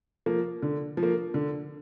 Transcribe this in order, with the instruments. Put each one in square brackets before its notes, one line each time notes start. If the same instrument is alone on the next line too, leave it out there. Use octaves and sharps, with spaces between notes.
[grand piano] F3 A#3
D3
F3
A#3
D3